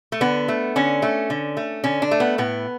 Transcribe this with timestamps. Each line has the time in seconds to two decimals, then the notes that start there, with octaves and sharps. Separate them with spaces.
0.12 A3
0.21 D3 B3
0.48 A3
0.76 D3 C#4
1.02 A3
1.30 D3
1.57 A3
1.84 D3 C#4
2.02 D4
2.11 A3
2.20 B3
2.38 A2 B3